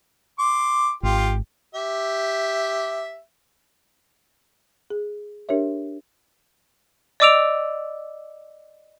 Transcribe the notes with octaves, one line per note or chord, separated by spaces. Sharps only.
C6 D6
G#1 F4 G4
G4 E5
G#4
D4 G4 A#4 C#5 E5
D5 D#5 D6 E6 D7 F7